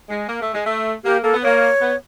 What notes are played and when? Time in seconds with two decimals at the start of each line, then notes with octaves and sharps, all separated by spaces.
0.09 G#3
0.28 A#3
0.41 A3
0.54 G#3
0.66 A3
1.04 A#3 G4
1.23 A#3 A4
1.34 B3
1.43 A#3 C#5
1.80 B3